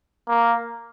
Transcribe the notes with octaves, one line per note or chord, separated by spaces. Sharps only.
A#3